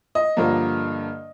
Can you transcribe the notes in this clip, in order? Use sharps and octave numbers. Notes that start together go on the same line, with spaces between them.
D#5
G2 D3 F3 A#3